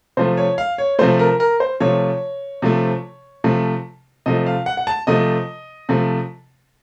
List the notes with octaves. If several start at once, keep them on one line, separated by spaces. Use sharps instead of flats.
C3 F3 A3 C5
C#5
F5
C#5
C3 F3 A3 C5
A#4
A#4
C5
C3 F3 A3 C#5
C3 F3 A3
C3 F3 A3
C3 F3 A3 D#5
F5
F#5
F#5
A5
C3 F3 A3 D#5
C3 F3 A3